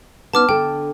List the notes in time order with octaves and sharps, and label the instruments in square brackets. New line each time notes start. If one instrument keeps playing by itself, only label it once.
[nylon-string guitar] B3 C#4 D#4 [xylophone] A5 D6 F6
[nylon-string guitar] D3 A4 [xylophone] G5